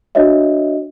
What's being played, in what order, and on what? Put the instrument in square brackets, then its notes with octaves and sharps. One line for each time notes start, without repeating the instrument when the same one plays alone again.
[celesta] D4 F#4 C#5 D#5 E5